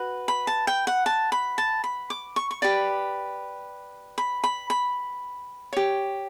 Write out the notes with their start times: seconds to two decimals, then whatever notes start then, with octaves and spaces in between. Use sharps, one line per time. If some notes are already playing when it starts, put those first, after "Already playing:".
Already playing: F#4 B4
0.28 B5
0.47 A5
0.67 G5
0.87 F#5
1.06 A5
1.32 B5
1.58 A5
1.84 B5
2.10 D6
2.36 C#6
2.51 C#6
2.62 G4 B4 D5 B5
4.18 B5
4.44 B5
4.70 B5
5.73 G4 C#5